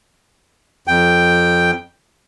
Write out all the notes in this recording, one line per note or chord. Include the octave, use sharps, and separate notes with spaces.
F2 G5